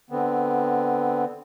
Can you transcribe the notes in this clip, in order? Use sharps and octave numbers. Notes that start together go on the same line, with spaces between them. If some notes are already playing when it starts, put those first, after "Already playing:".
D3 B3 C4